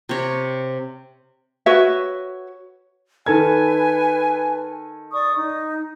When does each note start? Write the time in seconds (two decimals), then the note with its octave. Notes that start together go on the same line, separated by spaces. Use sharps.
0.09 C3 C#5 A#5
1.66 F#4 B4 C#5 E5
3.26 D#3 A4 B4 G#5 G#6
5.12 D5 C#6 D#6
5.35 D#4